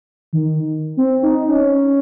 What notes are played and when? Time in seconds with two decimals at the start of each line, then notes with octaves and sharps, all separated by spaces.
0.33 D#3
0.97 C4
1.23 D#4
1.48 C#4